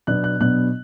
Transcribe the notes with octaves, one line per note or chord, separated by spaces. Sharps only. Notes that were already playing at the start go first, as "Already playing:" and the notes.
B2 F#3 B3 D4 F#6
F#6
B2 F#3 B3 D4 F#6